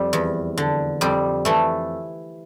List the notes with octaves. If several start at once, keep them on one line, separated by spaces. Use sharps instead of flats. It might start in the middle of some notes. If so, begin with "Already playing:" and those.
Already playing: F2 G3 G4
E2
D3
F2 G3 G4
E3 A3 A4